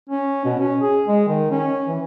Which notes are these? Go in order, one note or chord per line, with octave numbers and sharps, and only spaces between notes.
C#4
B2
C#4
G#4
G#3
D#3
C#4
E3